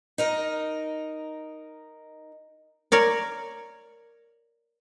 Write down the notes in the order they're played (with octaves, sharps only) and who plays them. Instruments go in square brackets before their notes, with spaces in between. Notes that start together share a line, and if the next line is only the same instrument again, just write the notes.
[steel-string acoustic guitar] D#4 A#4 D#5
[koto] A#4 C#5 D5